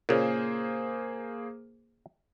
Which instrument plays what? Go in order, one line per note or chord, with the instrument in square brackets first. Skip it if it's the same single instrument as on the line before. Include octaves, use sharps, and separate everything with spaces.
[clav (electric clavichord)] A#2 C#3 [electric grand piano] A#3 G#4 C5